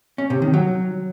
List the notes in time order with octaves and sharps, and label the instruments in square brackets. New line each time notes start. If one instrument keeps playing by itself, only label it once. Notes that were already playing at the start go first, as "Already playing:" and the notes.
[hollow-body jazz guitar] C#4
C3
D#3
F#3